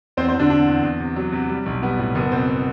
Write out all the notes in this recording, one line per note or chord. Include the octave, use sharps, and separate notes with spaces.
E2 C4 C5
C4 C5
E2
D3 D4
D3 D4
E2
E2
C3
F#3
C3
G3
B1
G3 B3
A2
F#1 B3
B2 C4